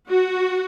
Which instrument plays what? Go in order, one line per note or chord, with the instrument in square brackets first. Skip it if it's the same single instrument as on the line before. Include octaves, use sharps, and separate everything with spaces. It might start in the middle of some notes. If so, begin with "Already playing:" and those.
[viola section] F#4